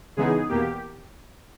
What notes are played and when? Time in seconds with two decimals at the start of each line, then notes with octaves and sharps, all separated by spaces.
0.17 C#3 E3 G#3 B3 D#4 G#4
0.49 E2 B2 A#3 G4